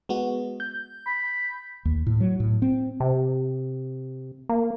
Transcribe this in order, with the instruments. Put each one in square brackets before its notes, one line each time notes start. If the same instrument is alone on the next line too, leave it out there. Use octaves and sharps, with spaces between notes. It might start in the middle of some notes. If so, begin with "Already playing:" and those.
[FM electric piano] G#3 B3 F#4
G6
[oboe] B5
[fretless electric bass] D#2
A2
F#3
A2
C4
[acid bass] C3
A#3